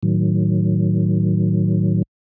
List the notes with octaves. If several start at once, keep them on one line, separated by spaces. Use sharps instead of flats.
A2 D#3 F#3